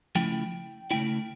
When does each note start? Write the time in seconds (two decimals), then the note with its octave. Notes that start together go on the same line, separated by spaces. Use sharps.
0.15 C#3 F3 A3 E4 G5
0.91 C#3 F3 A3 E4 G5